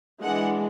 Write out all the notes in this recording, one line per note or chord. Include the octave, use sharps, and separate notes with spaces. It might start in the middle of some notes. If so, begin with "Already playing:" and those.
E3 G#3 D4 F#5